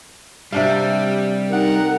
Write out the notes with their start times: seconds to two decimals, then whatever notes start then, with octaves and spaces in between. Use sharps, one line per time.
0.52 C3 G3 D4 F5
1.51 D#4 A#4 F#5